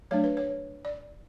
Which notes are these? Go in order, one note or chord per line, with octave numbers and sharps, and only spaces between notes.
F#3 A3 D4 C#5
B4
C#5
D5